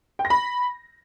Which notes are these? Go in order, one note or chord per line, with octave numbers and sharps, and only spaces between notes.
G5
A#6
B5